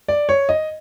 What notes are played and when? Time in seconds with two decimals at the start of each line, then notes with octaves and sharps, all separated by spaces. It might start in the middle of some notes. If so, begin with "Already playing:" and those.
0.08 D5
0.29 C#5
0.49 D#5